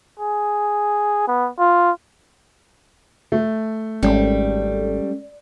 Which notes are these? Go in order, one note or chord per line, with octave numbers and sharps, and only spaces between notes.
G#4
B3
F4
A3
G#1 G3 G#3 C#4 A4